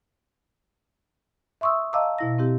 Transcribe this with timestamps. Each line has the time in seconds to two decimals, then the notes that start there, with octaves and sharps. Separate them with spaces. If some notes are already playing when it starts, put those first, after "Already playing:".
1.61 E5 C6 C#6 D#6 E6
1.93 D#5 F5 A5 A#5 D6 E6
2.18 B2 E4 A#6
2.38 C4 E4 G4